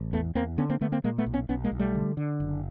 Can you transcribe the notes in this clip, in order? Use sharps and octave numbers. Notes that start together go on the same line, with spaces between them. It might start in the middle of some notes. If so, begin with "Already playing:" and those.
Already playing: A1
E2 A3 B3
E2 A#3 C4
D3 B3 C#4
A#3 C4
D3 A3 B3
A#3 C4
A#2 G#3 A#3
A3 B3
B1
B3 C#4
B1 B3 C#4
G#3 A#3
B1
G3 A3
D3
D3
F#1